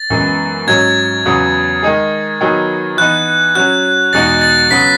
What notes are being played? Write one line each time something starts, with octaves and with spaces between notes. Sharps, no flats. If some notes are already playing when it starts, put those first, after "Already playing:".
Already playing: A6
F#2 E3 G#3 B3
G#2 F#3 C#4 G#6
E2 C#3 F#3 B3
D#3 G#3 D#4 G#4
D#3 F#3 B3 D#4 G#4
E3 B3 D#4 F#6
F#3 C#4 F#4 F#6
E2 B2 G#3 D#4 F#4 A6
A6
C#3 F#3 B3 F#4 B6